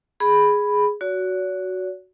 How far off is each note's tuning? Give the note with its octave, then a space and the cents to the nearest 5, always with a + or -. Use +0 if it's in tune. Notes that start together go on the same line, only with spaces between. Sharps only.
G#4 +0 B5 +0
F#4 +0 C#5 +45